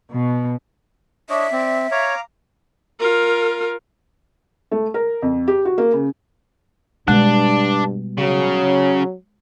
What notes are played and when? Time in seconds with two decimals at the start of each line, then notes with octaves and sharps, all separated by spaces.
0.11 B2
1.30 D4 C#5 D#5 E5
1.52 C4 D5
1.91 C#5 F5 A#5 D6
3.00 F4 A#4
4.71 A3
4.94 A#4
5.22 F2
5.48 G4
5.65 F#4
5.78 A#3
5.93 C#3
7.08 G2 B2 G3 G#3 D4
8.18 C#3 F#3